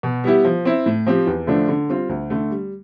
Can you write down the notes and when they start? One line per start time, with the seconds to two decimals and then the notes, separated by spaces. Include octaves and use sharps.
0.03 B2
0.24 G3 B3 E4 G4
0.44 F3
0.65 C4 E4
0.86 A2
1.06 F3 C4 G4
1.27 E2
1.47 D3 F3 A3 D4
1.68 D3
1.89 G3 C4 F4
2.09 D2
2.30 D3 A3
2.50 G3